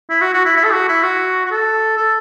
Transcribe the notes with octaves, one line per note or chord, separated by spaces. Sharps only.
E4
F#4
F#4
E4
E4
A4
F#4
E4
F#4
F#4
A4
A4